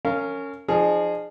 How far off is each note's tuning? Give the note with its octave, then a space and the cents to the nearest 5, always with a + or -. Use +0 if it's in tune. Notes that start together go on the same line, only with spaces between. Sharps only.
C#4 +0 A#4 -35 F5 -10
F3 +0 D#4 -40 G#4 +0